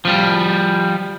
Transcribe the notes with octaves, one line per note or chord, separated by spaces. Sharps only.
F3 G3